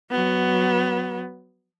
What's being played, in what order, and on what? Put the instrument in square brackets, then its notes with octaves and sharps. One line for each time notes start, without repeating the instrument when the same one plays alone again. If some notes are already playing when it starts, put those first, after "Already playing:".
[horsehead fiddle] F#3 B3